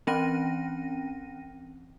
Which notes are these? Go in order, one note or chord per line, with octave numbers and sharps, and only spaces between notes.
E3 C4 C#4 G5 A#6 D#7